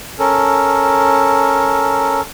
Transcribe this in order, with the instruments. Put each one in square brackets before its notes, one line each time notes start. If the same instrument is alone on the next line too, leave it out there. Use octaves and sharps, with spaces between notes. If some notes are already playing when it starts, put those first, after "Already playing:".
[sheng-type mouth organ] C#4 A4 A#4